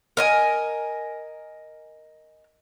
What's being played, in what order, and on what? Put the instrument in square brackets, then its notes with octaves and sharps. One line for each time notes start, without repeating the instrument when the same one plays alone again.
[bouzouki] A#4 D#5 G#5